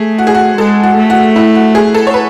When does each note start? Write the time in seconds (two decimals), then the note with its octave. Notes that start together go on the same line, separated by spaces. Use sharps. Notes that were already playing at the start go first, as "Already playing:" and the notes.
Already playing: A3 G#4
0.18 F#4
0.27 G#4
0.35 F#4
0.58 G#3 A4
0.83 F#4
0.97 A3
1.10 F#4
1.36 E4
1.55 F#4
1.75 G#4
1.94 A4
2.07 C#5
2.14 B4